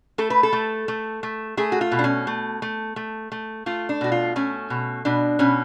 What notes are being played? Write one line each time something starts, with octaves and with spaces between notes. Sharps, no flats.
A3 A4
B4
A4
A3
A3
A3
A3 G#4
F#4
F4
B2
D4
C#4
A3
A3
A3
A3
A3 F4
D4
B2 F#4
F4
A3 C#4
B2
B2 D4
B2 C#4